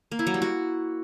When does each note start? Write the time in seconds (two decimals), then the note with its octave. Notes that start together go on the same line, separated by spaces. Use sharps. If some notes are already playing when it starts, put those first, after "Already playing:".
0.12 A#3
0.19 E4
0.27 F#3
0.34 G3
0.42 F#4